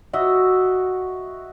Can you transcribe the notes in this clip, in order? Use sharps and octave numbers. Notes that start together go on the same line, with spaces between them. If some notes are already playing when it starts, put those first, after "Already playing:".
F#4 D#5 E5